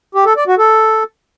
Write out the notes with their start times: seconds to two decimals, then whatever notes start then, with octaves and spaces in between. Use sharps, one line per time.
0.15 G4
0.26 A4
0.37 D5
0.47 F#4
0.58 A4